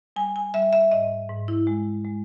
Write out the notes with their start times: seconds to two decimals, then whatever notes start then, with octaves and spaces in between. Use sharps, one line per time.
0.16 G3 G#5
0.36 G#5
0.54 G3 E5
0.73 E5
0.91 G#2 D#5
1.29 G#2
1.48 E4
1.67 G#3
2.05 G#3